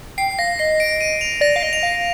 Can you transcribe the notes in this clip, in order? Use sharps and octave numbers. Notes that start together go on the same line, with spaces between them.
G5 C7
F5 A#6
D#5 C7
D7
D#7
F7
D5 A#6
F5
D#5
F7
F5